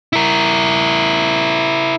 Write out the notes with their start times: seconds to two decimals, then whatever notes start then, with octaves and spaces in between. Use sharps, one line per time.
0.13 E4 A#4